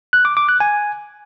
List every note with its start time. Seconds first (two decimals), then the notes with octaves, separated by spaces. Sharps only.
0.13 F#6
0.25 D6
0.37 D6
0.49 F#6
0.60 G#5